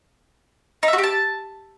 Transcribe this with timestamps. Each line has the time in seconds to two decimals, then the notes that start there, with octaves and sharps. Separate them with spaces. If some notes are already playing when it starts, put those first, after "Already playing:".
0.83 D#4
0.88 E5
0.93 F#4
0.98 G4
1.04 A5